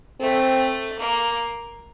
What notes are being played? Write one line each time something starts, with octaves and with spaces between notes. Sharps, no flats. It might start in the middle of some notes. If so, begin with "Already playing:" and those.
A3 C4
A#3